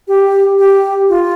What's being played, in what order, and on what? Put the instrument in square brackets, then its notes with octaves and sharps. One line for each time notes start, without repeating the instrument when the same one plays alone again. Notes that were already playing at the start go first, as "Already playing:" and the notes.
[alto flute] G4
G4
F4